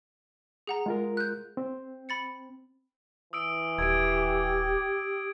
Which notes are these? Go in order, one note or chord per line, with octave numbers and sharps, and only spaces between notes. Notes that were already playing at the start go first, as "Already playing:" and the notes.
G#4 F#5 A#5
G#3 F4 A#4
F#6 G6
C4
B5 A6 C#7
E3 D#6 E6 D7
D#1 G4 G#6 D7